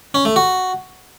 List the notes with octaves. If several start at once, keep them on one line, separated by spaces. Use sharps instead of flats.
C#4
A3
F#4